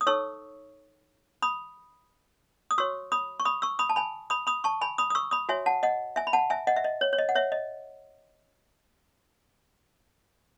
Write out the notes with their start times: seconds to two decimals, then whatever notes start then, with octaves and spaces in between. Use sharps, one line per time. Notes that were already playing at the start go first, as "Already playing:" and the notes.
0.01 D#6
0.07 D#4 A4 C#5 C#6 E6
1.42 B5 D#6
2.71 D#6
2.78 F#4 C#5 C#6 E6
3.12 B5 D#6
3.40 C#6
3.45 B5 D#6
3.62 C#6 E6
3.79 B5 D#6
3.90 A5
3.96 G#5 B5
4.30 B5 D#6
4.47 B5 D#6
4.64 A5 C#6
4.81 G#5 B5
4.98 B5 D#6
5.10 D#6
5.15 C#6 E6
5.31 B5 D#6
5.49 F#4 C#5 E5 G#5
5.66 F#5 A5
5.83 D#5 F#5
6.16 E5 G#5
6.27 B5
6.33 F#5 A5
6.50 E5 G#5
6.67 D#5 F#5
6.76 E5
6.85 D#5
7.01 C#5
7.13 C#5
7.19 D#5
7.29 F#5
7.35 C#5 E5
7.52 D#5